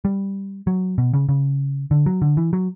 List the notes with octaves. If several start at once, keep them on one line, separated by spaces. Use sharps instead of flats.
G3
F#3
B2
C#3
C#3
D3
F#3
D3
E3
F#3